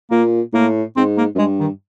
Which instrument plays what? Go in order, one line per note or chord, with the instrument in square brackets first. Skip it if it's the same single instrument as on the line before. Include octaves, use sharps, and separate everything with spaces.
[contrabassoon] A#2 [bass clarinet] A#3
[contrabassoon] A2 [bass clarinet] A#3
[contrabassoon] G#2 [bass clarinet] C4
[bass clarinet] A#3
[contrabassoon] F#2
[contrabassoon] G2 [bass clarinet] G#3
[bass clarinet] D#3